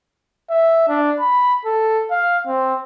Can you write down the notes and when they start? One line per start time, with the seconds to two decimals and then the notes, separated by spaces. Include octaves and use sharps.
0.50 E5
0.88 D4
1.20 B5
1.65 A4
2.11 F5
2.47 C4